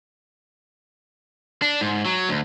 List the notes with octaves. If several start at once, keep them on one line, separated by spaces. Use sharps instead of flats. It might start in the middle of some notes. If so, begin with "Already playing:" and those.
D4
G#2
F#3
D2